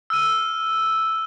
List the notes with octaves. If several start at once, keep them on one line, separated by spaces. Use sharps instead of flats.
E6 F6 D#7